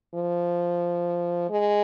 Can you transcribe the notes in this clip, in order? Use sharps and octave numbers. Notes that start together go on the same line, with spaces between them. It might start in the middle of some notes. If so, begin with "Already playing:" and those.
F3
G#3